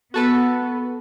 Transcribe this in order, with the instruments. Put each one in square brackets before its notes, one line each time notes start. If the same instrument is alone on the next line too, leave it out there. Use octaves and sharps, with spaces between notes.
[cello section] B3 [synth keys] F#4 A4 B4